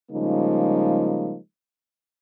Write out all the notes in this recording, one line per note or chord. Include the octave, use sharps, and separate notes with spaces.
C#3 F3 G3 G#3 A#3 D#4